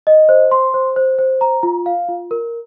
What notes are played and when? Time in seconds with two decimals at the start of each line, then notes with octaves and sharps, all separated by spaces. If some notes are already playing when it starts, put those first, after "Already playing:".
0.07 D#5
0.29 C5
0.51 C6
0.74 C5
0.96 C5
1.18 C5
1.41 A#5
1.63 F4
1.86 F5
2.08 F4
2.31 A#4